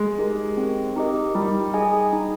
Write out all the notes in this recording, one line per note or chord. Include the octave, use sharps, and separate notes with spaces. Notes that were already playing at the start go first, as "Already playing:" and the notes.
Already playing: G#3
D#4 G4 A#4 D#5
C4
D#4 G4 A#4 D#5
G3 D#4
G#4 D#5 G#5
D#4